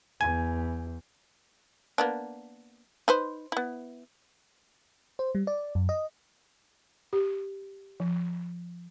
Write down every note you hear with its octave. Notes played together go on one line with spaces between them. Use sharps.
E2 G#5
A#3 B3 D4
D#4 B4 C5
B3 E4
C5
G3
D5
F#2
D#5
G4
F3